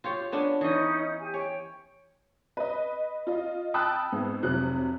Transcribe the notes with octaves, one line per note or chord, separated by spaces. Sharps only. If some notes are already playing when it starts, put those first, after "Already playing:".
F4 G4 C#5
B3 C#4 D4
E3 C#4 D#4 D#5 D#6
G4 G#5
C#5 G5
B4 D#5
F4 D#5
G5 A5 B5 D#6 E6 F#6
G#2 B3
F1 C3 F#3 F#6